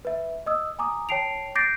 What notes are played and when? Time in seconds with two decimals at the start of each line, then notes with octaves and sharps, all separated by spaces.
0.05 B4 E5
0.46 D#5 D#6 E6
0.79 G#5 A#5 D6 D#6
1.09 C#5 G5 A5 C7 D7 F7
1.55 D6 G6 A6 A#6 C7 D7